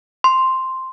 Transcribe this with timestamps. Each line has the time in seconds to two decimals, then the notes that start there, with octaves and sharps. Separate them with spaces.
0.24 C6